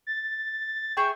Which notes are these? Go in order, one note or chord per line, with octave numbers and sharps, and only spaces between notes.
A6
G#4 E5 G5 C#6